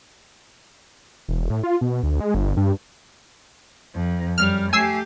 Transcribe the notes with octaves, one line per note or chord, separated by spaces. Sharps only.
E1
A2
F4
B2
D2
G#3
G1
G2
F2
F#2 G3 F6
A3 G4 G#5 E6 C7